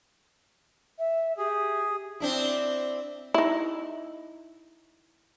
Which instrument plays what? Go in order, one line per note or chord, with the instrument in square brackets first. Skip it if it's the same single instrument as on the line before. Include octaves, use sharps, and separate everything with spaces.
[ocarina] E5
[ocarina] G4 [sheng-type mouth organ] G#4
[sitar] C4 D4 E4
[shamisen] D#4 E4